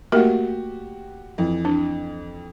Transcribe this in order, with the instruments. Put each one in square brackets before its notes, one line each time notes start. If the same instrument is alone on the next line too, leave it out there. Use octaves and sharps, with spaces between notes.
[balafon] A3 A#3 A#4 [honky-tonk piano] F#4 G4
[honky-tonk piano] F2 E3
[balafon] D4